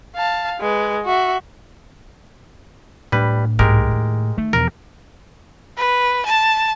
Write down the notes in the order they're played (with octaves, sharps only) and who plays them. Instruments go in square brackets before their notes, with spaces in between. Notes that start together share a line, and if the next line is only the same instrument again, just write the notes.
[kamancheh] F5 A5
G#3 B4
F#4 E5
[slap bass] A2 D4 [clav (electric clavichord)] G3 B4
[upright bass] C2 G#2 [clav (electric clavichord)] G#3 G4 A#4
[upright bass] D#2
[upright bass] D#3 [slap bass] A3
[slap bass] E2 B2 F3 [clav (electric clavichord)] A#4
[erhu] B4
A5